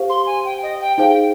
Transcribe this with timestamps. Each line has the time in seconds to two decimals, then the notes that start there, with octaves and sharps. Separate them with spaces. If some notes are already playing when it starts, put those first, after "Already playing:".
Already playing: G4 C5 F5
0.09 C6
0.26 G#5
0.45 G5
0.63 D#5
0.80 G5
0.98 D#4 G#4 C5 F5 G5